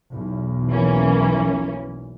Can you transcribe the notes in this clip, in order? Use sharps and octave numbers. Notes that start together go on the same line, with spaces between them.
B1 E2
E3 A#3 C#4